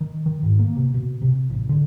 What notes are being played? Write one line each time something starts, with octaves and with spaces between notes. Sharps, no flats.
D#3
D#3
G#2
A#3
C3
B2
C3
A1
D3